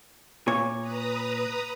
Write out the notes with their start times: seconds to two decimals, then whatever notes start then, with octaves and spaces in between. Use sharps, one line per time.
0.48 A#2 C#5
0.81 B4 A#5 D#6